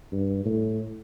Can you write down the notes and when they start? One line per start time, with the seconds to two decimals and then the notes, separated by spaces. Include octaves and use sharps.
0.12 G2
0.45 A2